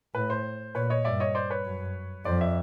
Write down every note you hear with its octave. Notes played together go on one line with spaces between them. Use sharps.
A2 B4
C5
A#2 B4 C#5
C#5 D#5
G2 D5 E5
C#5 D#5
C5 D5
B4 C#5
F#2
F2 C5 D5
D5 E5